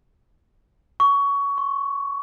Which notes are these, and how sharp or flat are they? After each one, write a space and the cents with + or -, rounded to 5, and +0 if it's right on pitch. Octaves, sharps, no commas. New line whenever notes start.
C#6 +20
C#6 -45